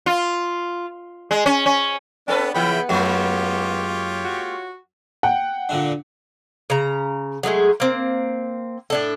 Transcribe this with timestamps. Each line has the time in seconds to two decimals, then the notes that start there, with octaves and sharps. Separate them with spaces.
0.06 F4
1.31 G#3
1.46 C#4
1.66 C#4
2.28 B3 C4 D4 A4 B4
2.54 C#3 E3 B3 E4 G5 B5
2.89 F#2 G#3 A#3 F4 G4 C#5
4.25 F#4
5.23 F#5 G5
5.69 A#2 D3 D4
6.70 C#3 A#5
7.43 F#3 G#3 A3 G#4
7.80 A#3 C4
8.90 A2 D4 A4